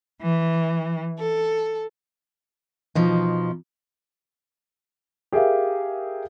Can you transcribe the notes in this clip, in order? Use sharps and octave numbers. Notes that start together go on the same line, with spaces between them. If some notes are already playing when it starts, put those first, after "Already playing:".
E3
A4
B2 F3 D#4
G4 G#4 A#4 E5 F5